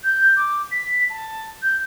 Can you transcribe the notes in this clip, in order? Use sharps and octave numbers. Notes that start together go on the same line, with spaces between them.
G6
D6
B6
A5
G6